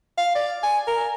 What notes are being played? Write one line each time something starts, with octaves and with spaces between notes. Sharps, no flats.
F5
D5
G#5
A#4